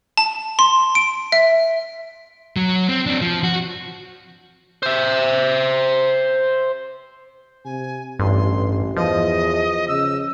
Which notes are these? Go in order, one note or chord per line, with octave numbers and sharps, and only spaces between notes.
A5
C6
D7
E5
F#3
C4
C4 D4
F3
F#4
C5 E5
C3 G#5
A1 G2 C6
E2 F3 D#5
C#3 E6